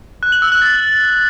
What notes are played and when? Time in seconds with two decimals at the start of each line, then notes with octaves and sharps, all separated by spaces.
0.23 F#6
0.32 F#7
0.42 E6
0.52 F#6
0.62 A6